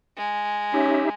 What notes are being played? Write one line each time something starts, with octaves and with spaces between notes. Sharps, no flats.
G#3
C#4 D#4 G4 E5